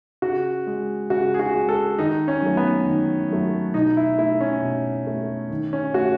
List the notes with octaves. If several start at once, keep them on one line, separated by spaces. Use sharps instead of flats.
C#3 F#4
G#3
C#3 F#4
G#4
F#4
G#3
A4
D#3 D#4
C#4
F#3 A3
B3
D#3
F#3 A3
B2 D#4
E4
A3 E4
C#4
B2
A3
D#3
C#4
A3 F#4